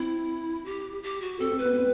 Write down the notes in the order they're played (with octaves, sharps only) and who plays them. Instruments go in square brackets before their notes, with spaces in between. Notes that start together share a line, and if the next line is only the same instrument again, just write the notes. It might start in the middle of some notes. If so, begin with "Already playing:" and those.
Already playing: [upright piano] C4 [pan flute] E4
[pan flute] G4
G4
F#4
[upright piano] C4 [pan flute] A4
[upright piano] C4
[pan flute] B4
[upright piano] B3
C4